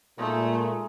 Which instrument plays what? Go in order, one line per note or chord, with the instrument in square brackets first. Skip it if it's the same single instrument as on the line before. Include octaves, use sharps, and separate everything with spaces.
[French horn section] A#2 [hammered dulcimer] G#3 D#4 A4 [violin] A3